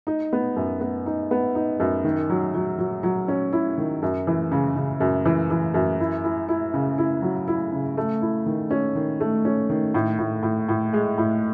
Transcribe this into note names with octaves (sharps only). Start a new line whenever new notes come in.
D#4
B3
F#2
B3
D#4
B3
D#4
F#2
D#3
F#3
F#3
F#3
F#3
C#4
E4
D#3
F#2
E3
C#3
C#3
F#2
E3
E3
F#2
E4
E4
E4
C#3
E4
F#3
E4
C#3
A3
E4
D#3
C#4
D#3
A3
C#4
D#3
A2
A2
A2
A2
G#3
A2